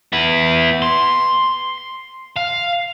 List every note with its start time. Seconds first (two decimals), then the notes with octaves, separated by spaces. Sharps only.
0.13 B3 E4
0.82 C6
2.36 F5